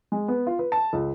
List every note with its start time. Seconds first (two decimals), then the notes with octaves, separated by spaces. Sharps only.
0.12 G#3
0.28 B3
0.47 F4
0.59 B4
0.72 A5
0.93 C#2